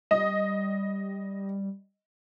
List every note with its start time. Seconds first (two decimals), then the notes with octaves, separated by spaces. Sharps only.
0.11 G3 D#5